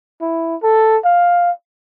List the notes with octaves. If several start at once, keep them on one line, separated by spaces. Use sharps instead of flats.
E4
A4
F5